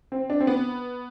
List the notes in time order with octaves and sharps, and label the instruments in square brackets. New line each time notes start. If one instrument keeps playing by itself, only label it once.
[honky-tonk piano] C4
D4
C4
B3